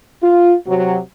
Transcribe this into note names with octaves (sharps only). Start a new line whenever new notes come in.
F4
C3 F#3